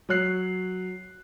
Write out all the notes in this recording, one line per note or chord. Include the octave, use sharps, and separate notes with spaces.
F#3 C#5 F#6 C7